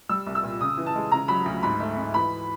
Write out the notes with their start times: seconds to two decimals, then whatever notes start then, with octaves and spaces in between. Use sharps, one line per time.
0.09 G3 E6
0.27 C2
0.35 E6
0.43 A#2
0.61 C#3 D#6
0.78 E3
0.86 A5
0.95 G#3
1.12 C#3 A#5
1.28 F#3 B5
1.46 D2
1.63 G#2 B5
1.80 A3
1.97 G#2
2.14 E3 B5